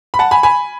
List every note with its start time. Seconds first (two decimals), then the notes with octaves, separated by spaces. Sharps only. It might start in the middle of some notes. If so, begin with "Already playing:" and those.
0.14 B5
0.19 F#5 A5
0.31 G#5 B5
0.43 G#5 B5